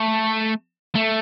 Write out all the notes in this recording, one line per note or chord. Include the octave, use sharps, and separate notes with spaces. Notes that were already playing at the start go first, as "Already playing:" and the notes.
Already playing: A3
A3